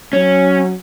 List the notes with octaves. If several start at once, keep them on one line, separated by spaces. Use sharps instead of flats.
F#3 C#4